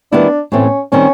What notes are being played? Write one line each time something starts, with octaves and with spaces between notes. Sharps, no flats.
D#3 G3 B3 D4 E4
A2 E3 A3 C4 C#4
D#3 G3 C4 C#4